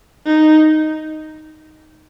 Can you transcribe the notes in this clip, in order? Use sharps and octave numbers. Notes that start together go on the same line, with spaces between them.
D#4